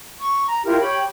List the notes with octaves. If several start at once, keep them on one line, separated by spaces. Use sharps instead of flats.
C#6
A#5
E4 F4 G4 A#4
G4 C#5 G5 B5